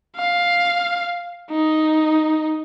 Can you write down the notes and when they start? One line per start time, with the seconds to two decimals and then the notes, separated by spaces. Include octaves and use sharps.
0.17 F5
1.51 D#4